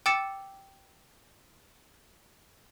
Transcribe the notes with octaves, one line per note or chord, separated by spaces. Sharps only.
G5 D6 E6 A6 C#7 E7